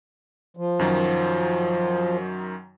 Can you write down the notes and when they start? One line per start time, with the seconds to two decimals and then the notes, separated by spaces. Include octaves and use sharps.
0.57 F3
0.79 F#2 D#3 F#3